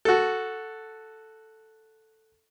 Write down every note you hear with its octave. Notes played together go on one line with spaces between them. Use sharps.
F#4 A4